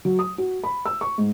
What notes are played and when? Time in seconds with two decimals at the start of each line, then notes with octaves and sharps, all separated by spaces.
0.05 F#3
0.19 D#6
0.38 F#4
0.64 B5
0.86 E6
1.01 C#6
1.18 G#2